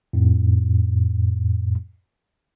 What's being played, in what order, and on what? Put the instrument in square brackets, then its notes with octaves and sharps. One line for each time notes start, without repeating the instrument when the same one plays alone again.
[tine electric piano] F2 A2